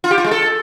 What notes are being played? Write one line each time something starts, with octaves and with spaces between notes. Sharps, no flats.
F4
G4
F4
G#3
A4